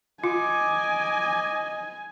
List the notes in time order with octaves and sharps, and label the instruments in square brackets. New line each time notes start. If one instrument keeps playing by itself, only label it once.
[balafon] F4 [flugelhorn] D#5 [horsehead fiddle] G#5 [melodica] D6